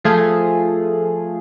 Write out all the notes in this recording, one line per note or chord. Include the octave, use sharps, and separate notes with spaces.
F3 A3 F4 G#4